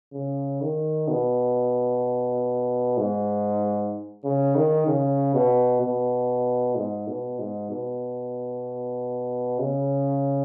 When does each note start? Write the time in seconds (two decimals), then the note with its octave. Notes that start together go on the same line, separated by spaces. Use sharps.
0.14 C#3
0.62 D#3
1.09 B2
2.98 G#2
4.24 C#3
4.56 D#3
4.86 C#3
5.34 B2
5.81 B2
6.76 G#2
7.08 B2
7.39 G#2
7.70 B2
9.59 C#3